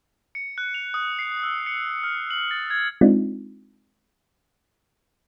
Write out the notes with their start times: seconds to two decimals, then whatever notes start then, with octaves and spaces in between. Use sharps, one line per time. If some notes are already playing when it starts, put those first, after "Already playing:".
0.35 C#7
0.58 F#6
0.74 F7
0.94 D#6
1.19 C7
1.43 E6
1.66 C#7
2.04 F6
2.30 F#7
2.51 A6
2.70 G#6
3.01 G#3 C4 D4 D#4 F4